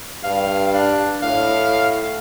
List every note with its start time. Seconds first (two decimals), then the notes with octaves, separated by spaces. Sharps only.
0.24 G2 F5
0.74 D4
1.23 A2 F5